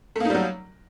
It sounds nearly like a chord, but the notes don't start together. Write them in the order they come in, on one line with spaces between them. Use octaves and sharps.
A3 A#3 D#4 G3 F#3